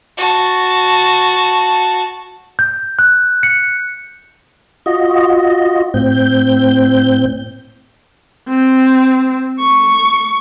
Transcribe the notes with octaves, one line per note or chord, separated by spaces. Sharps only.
F#4 A5
G6
F#6
C#7
F4 F#4 D#5
A2 C4 G6
C4
C#6